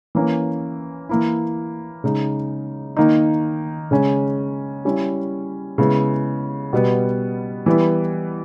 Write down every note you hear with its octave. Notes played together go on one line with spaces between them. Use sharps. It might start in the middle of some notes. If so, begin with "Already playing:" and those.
E3 A#3 C#4
E3 A#3 E4
C#3 G#3 D#4
D#3 A#3 D#4
C#3 G#3 C#4
G3 C#4 E4
C#3 G#3 B3 E4
B2 G3 B3
E3 G3 B3 E4